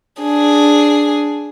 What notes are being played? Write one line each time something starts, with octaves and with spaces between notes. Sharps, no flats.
D4 G#4